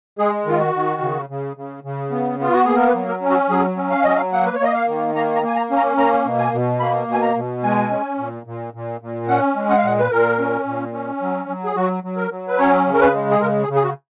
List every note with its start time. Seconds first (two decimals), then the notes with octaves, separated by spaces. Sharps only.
0.19 G#3 G#4
0.46 D#3 F4
0.60 F#4
0.74 D#3
1.01 C#3
1.30 C#3
1.57 C#3
1.84 C#3
2.11 B3
2.40 B3 F4
2.54 F#4
2.65 A#3 G#4
2.76 A#4
2.87 B4
2.94 F#3
3.09 A#4
3.22 C#4
3.29 F#4
3.49 F#3 G#4
3.76 C#4
3.91 F5
4.04 F#3 D#5
4.16 F5
4.33 A#3 F#5
4.46 B4
4.55 C#5
4.60 A#3 D#5
4.74 F5
4.88 D#3
5.15 A#3 A#5
5.36 A#5
5.43 A#3 G#5
5.56 A#5
5.71 C#4
5.77 A#5
5.97 A#3 A#5
6.25 B2
6.39 G#5
6.53 B2
6.80 A#3 B5
7.08 B2
7.13 G#5
7.22 A#5
7.36 B2
7.63 G#3 G#5
7.90 C#4
8.19 A#2
8.46 A#2
8.74 A#2
9.01 A#2
9.28 C#4 F#5
9.56 G#3
9.69 F#5
9.78 F5
9.83 A#2 F#5
9.99 B4
10.11 A#2 A#4
10.39 C#4
10.66 A#2
10.93 C#4
11.21 F#3
11.49 F#3
11.65 G#4
11.76 F#3 F#4
12.04 F#3
12.17 A#4
12.31 F#3
12.48 B4
12.58 C#4 C#5
12.87 C#3
12.94 A#4
13.01 B4
13.14 G#3
13.31 G#4
13.41 C#3 A#4
13.63 G#4
13.69 C#3
13.75 G#4
13.84 F#4